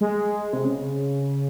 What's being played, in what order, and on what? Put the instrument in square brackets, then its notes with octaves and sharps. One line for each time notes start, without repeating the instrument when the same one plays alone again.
[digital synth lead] G#3
C3
C#3